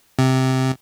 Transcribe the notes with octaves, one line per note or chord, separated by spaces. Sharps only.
C3